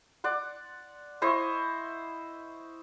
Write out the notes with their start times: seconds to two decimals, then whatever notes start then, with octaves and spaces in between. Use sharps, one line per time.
0.24 D5 F#5 C6
1.22 E4 C5 D#5 C#6